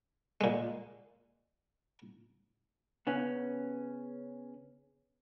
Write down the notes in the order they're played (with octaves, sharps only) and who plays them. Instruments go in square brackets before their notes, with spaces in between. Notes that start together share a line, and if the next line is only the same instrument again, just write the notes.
[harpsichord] A#2 G#3
[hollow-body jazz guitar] C#3 B3 C#4